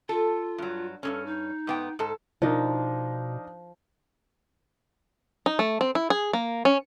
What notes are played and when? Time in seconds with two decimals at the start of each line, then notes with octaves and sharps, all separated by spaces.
0.09 F4 A4
0.58 G2 F#3
1.03 G2 A#2 C#4 A4
1.26 D#4
1.67 G#2 B3 G5
1.99 G#2 A4
2.42 B2 F3 D4 D#4 A#4
5.46 D#4
5.59 A3
5.81 C4
5.95 E4
6.10 G#4
6.33 A#3
6.65 C#4